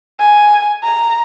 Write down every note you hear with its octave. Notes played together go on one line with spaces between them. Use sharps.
G#5
A#5